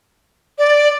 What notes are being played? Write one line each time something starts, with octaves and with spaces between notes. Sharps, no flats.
D5